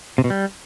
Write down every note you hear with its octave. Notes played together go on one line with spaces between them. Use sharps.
C3
B2
G3